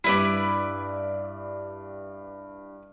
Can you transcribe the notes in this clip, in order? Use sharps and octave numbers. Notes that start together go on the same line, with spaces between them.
G2 G3 E4 B4 D5